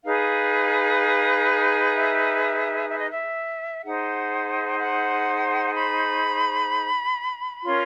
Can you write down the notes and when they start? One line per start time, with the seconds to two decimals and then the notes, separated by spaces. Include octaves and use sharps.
0.04 D#4 G#4 B4 F5
1.95 E5
2.89 E5
2.99 D#5
3.10 E5
3.85 D#4 G#4 C5 F#5
4.79 F#5
5.74 B5
7.64 C#4 F4 A#4 C#5 C6